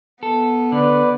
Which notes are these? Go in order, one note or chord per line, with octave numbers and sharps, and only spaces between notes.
B3 A4
D3 B4 D5